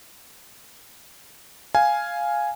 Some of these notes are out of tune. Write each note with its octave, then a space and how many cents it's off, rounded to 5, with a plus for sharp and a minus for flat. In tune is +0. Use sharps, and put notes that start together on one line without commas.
F5 +0 G#5 +0